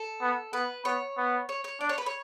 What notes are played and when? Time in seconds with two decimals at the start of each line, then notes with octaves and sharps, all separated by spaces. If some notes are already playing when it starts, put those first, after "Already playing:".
Already playing: A4
0.21 B3
0.53 B3 B4
0.85 B3 C#5
1.18 B3
1.49 C#5
1.64 C#5
1.80 D4 D5
1.89 C#5
1.98 B4
2.06 C#5